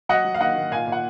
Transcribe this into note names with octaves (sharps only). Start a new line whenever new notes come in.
F#3 D#5 F#5
F#3
F5
D#3 D#5 F#5
D#3
A#2 F5 G#5
A#2
F#5